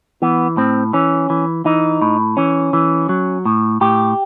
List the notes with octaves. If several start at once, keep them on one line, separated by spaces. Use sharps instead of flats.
E3 B3
A2 C4
E3 C#4
E3
E3 D#4
A2
E3 C#4
E3
F#3
A2
A2 G4